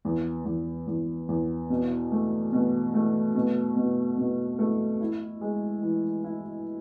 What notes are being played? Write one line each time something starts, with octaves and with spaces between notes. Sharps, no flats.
E2
E2
E2
E2
B2
A3
B2
A3
B2
B2
B2
A3
E4
G#3
E3
E4